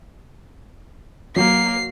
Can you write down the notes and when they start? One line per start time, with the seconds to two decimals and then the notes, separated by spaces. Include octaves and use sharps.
1.36 F#3 A#3 C7